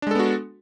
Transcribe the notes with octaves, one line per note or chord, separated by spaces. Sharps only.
G#3 B3 D4 F#4 A4